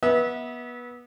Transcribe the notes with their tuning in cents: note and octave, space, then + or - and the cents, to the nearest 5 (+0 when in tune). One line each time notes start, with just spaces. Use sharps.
B3 -20 E5 -30